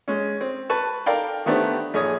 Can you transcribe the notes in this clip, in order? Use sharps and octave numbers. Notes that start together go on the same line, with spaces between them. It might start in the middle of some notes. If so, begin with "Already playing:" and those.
G#3 C#4
C4
B4 A5 C#6
A4 A#4 D5 F5 G5
D#3 A3 B3 D4 G4 C5
A#1 G#4 C#5 D#6